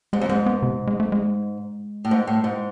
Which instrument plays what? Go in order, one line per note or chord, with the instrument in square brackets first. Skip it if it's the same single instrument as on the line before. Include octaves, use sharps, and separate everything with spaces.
[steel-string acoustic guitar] G#2 [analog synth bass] G#3
[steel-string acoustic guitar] F2
[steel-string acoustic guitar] G#2 [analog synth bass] G#3
[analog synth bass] B3
C3
G#3
A3
G#3
[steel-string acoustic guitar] A2
G#2
A2
G#2